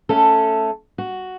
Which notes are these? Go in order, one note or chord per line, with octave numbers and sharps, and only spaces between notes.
A3 C#4 A4
F#4